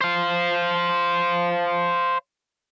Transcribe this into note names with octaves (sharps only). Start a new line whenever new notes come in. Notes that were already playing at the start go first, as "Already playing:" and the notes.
C5 F5